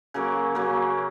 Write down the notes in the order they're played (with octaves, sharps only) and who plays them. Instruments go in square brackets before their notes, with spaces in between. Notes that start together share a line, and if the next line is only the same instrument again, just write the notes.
[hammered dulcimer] C#3 F#3 A#3
C#3 F#3 A#3